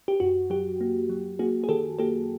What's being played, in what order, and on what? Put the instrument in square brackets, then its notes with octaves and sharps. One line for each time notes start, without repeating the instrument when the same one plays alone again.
[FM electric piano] G4
F#2 F#4
F#3 G4
A#3
F#3
A#3 F#4 G#4
G#4
D#3 G4 A4
A#3 G4 A4